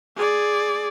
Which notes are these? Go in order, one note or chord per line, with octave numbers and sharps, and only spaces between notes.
G#4 D5